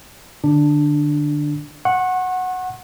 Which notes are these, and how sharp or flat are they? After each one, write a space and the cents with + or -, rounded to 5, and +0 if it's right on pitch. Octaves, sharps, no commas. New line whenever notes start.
D3 +25 D4 +5
F#5 -5 C#6 -40